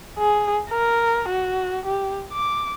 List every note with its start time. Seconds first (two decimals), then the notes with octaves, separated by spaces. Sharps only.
0.18 G#4
0.70 A#4
1.29 F#4
1.86 G4
2.32 D6